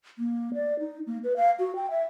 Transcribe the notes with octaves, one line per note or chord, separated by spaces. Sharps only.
A#3
D5
D#4
A#3
B4
F5
F#4
G5
E5